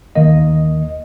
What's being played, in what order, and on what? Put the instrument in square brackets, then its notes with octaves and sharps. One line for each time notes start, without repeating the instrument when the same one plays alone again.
[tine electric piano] D#2 D#3 A#3 D#5